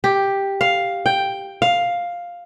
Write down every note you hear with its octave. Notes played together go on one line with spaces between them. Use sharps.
G4
F5
G5
F5